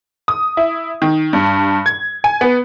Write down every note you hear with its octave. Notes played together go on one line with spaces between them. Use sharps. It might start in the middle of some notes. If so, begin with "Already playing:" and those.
D#6
E4
D#3
G2
G#6
G#5
B3